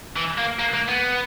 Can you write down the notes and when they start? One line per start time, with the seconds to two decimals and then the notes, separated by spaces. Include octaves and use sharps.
0.16 E3
0.38 A#3
0.59 A#3
0.74 A#3
0.88 B3